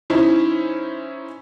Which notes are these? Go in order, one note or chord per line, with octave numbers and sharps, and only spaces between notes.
E3 C#4 D#4 E4 C5